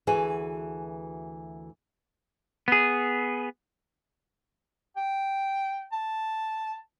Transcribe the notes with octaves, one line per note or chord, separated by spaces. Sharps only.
D2 E3 F#4 G#4 B4 G#5
B3 G#4
G5
A5